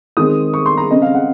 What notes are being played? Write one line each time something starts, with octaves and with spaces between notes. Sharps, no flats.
D#3 G#3 C4 D#6
C#6
C6
A#5
C#3 G#3 C4 D#5
F5
F#5